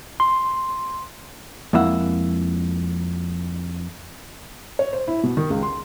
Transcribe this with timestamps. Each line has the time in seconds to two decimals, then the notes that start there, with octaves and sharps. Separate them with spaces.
0.20 C6
1.73 F2 G#3 A#3 E4 E5 F#5
4.79 C#5
4.93 C5
5.08 E4
5.23 B2
5.37 D#3
5.50 C#2
5.63 C6